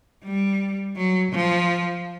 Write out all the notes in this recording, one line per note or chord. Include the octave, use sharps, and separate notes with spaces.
G3
F#3
F3